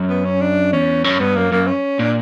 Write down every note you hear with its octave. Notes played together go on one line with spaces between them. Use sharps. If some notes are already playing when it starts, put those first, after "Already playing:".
Already playing: F#2
B3
C#4
D4
E2 C#4
F#2 C#4
G2 B3
F#2 A#3
F#2 A#3
C#4
A#2 D4